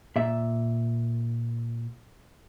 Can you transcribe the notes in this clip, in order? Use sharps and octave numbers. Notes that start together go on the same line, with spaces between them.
A#2 E5